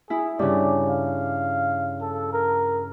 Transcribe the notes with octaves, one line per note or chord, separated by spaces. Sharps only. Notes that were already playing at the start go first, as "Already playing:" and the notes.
E4 G#4
G2 C#3 D5
F5
A4
A#4